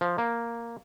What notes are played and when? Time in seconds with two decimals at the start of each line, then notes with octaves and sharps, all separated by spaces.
0.01 F3
0.18 A#3